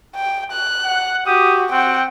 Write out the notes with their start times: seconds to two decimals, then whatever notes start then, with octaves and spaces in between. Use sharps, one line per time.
0.15 G5
0.52 F#6
0.84 F#5
1.27 F#4 G4 D#6
1.72 C4 F#5 G5